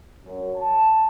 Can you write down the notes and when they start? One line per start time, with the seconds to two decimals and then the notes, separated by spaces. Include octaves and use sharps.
0.25 F#2
0.56 A5